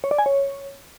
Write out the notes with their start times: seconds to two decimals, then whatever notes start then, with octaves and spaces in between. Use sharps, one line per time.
0.04 C#5
0.11 D5
0.19 G#5
0.26 C#5